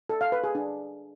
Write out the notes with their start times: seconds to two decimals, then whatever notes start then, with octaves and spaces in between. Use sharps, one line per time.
0.09 A4
0.21 F5
0.32 B4
0.44 G#4
0.55 D4